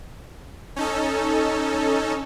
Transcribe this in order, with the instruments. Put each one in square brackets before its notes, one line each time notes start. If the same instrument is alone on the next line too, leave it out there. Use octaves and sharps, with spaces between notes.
[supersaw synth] C#4 D#4 A4